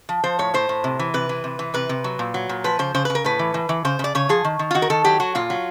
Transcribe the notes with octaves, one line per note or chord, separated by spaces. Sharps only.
F3
F3 C5
A2 C#5
A2 C5
A2
C3
E3
C3 B4
E3
C3
E3
C3 B4
C3
F#3
A#2
F#3
A#2
F3 B4
C#3 C5
C#3 C5
C#3 B4
A#4
A2 B4
E3
E3
E3
C#3 C5
C#3 D5
C#3 C#5
F3 G#4
D#3
D#3
F4
D#3 F#4
A#4
D#3 A4
F#3 G4
F#3 F#4
A#2 F4
F#3